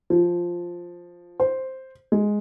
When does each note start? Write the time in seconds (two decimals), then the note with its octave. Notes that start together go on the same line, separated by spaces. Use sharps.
0.10 F3
1.40 C5
2.12 G#3